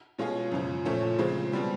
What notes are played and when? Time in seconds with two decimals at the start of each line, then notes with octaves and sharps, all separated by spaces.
0.18 B2 G#3 C#4 F4 G#4
0.52 F#2 C#3 F3
0.85 A#2 F3 A3 C#4
1.19 C#3 F3 G#3 C4
1.52 B2 G3 C4